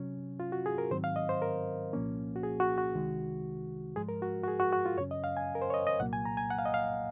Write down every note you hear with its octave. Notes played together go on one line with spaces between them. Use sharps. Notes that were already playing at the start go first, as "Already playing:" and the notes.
Already playing: C3 F#3 C#4
F4
F#4
G#4
A#4
G#2 D#3 F#3 C4 C5
F5
D#5
C5
A#4
C2 A#2 F3 A#3 C#4
F#4
G#4
F#4
F#4
C2 C3 D#3 G#3
G#2 F3 G#3 G#4
A#4
F#4
F#4
G#4
F#4
F#4
F4
F#2 C#3 F#3 C#4 C#5
D#5
F5
G#5
A#4
C5
C#5
D#5
D#5
C2 A#2 F#3 A#3 F#5
G#5
A#5
G#5
F#5
F5
D#5
F5